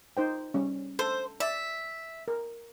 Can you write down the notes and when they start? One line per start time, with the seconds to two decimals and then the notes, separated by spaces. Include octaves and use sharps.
0.17 D#4 C5 G5
0.54 G3 C#4
0.99 A4 C5
1.40 D5 E5
2.28 A#4